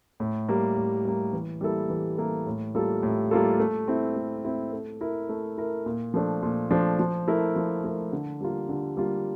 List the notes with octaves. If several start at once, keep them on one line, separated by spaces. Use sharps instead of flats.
A2
G3 A#3
A2
G3 A#3
E3
G3 A#3 E4 A4
E3
G3 A#3 E4 A4
A2
G3 A#3 F4 A4
A2
G3 A#3 F4 A4
A3
C4 E4
A3
C4 E4
A3
E4 A#4
A3
E4 A#4
A#2
F3 A3 D4
A#2
F3 A3 D4
F3
A3 E4 A#4
F3
A3 E4 A#4
D3
G3 A#3 F4
D3
G3 A#3 F4